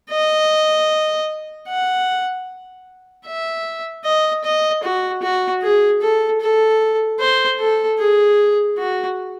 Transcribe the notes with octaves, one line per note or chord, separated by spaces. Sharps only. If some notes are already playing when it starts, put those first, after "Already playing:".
D#5
F#5
E5
D#5
D#5
F#4
F#4
G#4
A4
A4
C5
A4
G#4
F#4